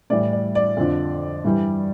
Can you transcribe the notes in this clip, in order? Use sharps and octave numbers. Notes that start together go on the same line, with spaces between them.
A2 E3 G3 D5
D5
D5
F2 D3 F3
G2 E3 G3